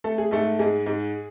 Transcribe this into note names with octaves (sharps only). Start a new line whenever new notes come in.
A3 A4
G#4
G#2 A3 A4
G#2 G#3 G#4
G#2